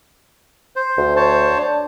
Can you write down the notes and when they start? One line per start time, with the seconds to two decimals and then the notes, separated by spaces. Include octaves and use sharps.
0.76 C5
0.98 D2
1.16 C5 C#5 A5
1.58 D4